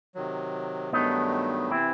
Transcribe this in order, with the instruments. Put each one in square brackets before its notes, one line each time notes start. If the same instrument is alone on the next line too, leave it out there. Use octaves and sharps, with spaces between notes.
[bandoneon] C3 D#3 F#3
[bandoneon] G2 D#3 F#3 A3 [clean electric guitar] B3 D#4
[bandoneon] C3 E3 [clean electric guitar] C4 E4